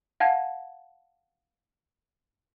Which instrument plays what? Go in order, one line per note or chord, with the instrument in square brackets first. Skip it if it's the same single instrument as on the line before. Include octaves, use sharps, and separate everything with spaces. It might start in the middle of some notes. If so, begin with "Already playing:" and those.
[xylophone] F5 F#5 A5 G#6